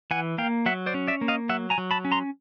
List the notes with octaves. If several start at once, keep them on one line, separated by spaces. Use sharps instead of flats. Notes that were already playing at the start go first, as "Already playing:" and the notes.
E3 F#5 G#5
A#3 F5 G5
F#3 E5 F#5
C5 D5
C#4
D5 E5
A#3
D#5 F5
F#3 E5 F#5
G#5 A#5
F#3
A5 B5
C#4
A#5 C6